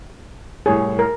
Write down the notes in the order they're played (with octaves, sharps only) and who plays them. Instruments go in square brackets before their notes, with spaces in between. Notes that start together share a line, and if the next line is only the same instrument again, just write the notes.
[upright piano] C2 A2 C#5 [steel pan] G#4
[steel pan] A#4